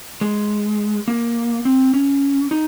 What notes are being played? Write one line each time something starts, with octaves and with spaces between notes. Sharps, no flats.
G#3
A#3
C4
C#4
D#4